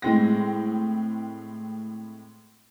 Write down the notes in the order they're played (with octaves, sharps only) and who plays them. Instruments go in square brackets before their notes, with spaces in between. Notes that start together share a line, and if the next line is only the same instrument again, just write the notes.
[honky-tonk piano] A2 G#3 C4 A#6